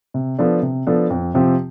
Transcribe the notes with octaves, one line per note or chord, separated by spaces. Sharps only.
C3
F3 B3 D4 A4
C3
F3 B3 D4 A4
F2
C3 F3 C4 G4